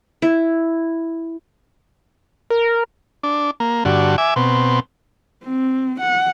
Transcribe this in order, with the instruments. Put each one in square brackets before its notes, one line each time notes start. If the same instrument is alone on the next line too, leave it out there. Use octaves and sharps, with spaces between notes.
[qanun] E4
[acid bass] A#4
[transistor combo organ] D4
A#3
G2 D3 F#4
E5 G#5 D6
B2 C4
[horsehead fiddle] C4
F#5